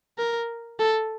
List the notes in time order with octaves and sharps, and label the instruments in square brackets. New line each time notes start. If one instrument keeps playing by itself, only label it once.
[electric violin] A#4
A4